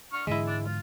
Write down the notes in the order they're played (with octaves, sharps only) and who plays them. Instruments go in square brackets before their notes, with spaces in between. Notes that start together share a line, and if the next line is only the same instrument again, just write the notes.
[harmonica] D3 C#6 F6
[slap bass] G#2 D3 E3 [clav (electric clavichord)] G#3 E4 [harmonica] D#5 E5
[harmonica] D4 D5
F4